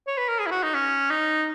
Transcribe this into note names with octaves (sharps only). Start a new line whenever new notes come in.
C#5
B4
A#4
G#4
E4
F#4
D#4
C#4
D#4